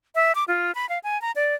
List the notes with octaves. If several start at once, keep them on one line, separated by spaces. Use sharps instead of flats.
E5
D6
F4
B5
F5
G#5
A#5
D5